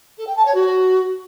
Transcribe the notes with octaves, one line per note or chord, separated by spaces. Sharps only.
A4
G5
A5
C#5
F#4